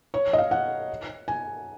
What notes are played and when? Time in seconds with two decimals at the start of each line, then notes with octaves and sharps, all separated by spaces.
0.14 C#5
0.33 D#5
0.38 F5
0.51 F#5
1.28 G#5